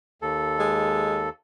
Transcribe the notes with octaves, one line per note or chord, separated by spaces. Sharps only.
D#2 A4
G#3